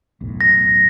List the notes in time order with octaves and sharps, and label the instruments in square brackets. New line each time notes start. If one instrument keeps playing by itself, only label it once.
[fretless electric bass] B1 E2 A2
[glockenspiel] A#6